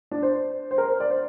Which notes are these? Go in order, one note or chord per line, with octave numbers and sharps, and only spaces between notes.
D4
C5
C5
A#4
C5
D5
C5